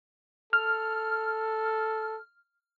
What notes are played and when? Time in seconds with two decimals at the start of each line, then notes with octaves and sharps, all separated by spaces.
0.53 A4 F6